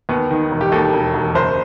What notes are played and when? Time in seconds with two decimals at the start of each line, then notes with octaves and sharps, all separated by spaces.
0.09 D#2 B3
0.31 D#3
0.51 E1
0.61 G4
0.72 D#2 A4
0.93 E1
1.14 E1
1.35 F#1 C5